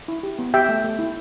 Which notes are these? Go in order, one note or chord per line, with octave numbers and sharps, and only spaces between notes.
E4
G4
B3
G4 E5 G5
A3
A3
E4